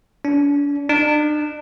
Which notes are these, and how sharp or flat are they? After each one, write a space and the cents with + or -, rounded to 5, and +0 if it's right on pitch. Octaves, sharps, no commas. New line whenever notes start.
D4 -40
D4 +40